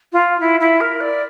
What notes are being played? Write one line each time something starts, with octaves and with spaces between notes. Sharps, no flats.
F4
E4
E4
A#4
D5